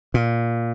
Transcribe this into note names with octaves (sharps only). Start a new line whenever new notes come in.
A#2